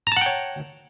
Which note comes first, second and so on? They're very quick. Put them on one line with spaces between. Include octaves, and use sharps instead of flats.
A#5 A5 F#5 G5 C#5